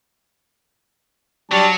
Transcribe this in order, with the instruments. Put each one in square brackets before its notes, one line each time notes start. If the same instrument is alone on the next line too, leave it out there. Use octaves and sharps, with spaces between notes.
[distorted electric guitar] F#3 [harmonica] G3 D4 A5